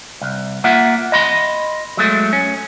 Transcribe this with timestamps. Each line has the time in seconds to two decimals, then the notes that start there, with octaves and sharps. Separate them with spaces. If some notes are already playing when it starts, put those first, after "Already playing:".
0.21 C2
0.64 A#3 F4 E5 F#5
1.12 D#5 B5 C6
1.97 F#3 G#3 A3
2.33 C#4